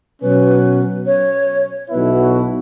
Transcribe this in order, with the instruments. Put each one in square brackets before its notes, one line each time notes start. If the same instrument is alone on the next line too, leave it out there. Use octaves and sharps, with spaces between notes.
[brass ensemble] B2 F#3 C#4 [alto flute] B4
[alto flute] C#5
[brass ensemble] B1 B2 B3 E4 [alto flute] B4
[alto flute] F#4